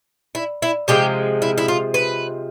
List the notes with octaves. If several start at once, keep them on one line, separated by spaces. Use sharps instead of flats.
E4
E4
C3 F3 G#3 G4
E4
E4
F4
B4